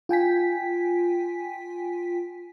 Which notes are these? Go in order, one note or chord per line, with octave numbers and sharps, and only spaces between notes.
F4 G5 G#5 B6